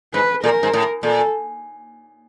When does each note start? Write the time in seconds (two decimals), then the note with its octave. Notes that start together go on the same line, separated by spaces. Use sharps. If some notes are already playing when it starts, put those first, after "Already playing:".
0.14 G#2 B4
0.44 A#2 A#4
0.63 G#2
0.73 A2
1.03 A#2 A4